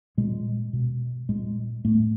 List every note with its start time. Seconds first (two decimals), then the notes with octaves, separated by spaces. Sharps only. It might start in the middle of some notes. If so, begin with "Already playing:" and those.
0.17 A#2 G#3
0.73 B2
1.29 A#2 G#3
1.85 A2 A3